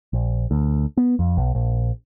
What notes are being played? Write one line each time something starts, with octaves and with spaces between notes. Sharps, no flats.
A#1
D2
B3
F2
B1
A#1